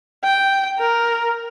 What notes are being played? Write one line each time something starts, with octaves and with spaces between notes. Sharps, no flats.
G5
A#4